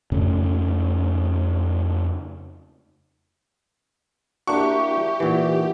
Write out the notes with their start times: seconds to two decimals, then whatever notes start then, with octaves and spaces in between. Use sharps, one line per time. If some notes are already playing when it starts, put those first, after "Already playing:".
0.12 F2 C#3 A3
4.47 A#3 D4 E4 F#4 G4 E5 C#6
5.20 A#2 E3 D#4 F#5